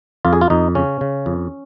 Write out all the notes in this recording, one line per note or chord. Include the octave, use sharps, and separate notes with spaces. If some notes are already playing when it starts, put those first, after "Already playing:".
F2 F4
G#4
F4
F2 D#4
C#3 C#4
C#3
F2